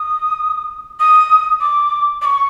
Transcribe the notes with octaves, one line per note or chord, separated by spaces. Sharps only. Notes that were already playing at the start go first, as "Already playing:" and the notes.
Already playing: D#6
D#6
D6
D6
C#6